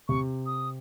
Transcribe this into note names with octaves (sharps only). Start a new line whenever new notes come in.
C3 C#6
D#6